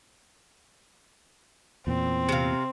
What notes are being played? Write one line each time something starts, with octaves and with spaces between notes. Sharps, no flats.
E2 A#2 C4
C3 F5